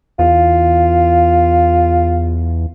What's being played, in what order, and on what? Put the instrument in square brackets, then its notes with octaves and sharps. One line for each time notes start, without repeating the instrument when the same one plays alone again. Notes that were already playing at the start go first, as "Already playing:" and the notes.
[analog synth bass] E2 [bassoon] F4